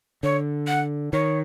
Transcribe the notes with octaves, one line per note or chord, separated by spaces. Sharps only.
D3 C#5
F#5
D#3 C#5